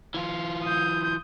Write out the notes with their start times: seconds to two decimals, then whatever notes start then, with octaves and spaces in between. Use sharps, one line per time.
0.14 E3 F4
0.64 D#6 G6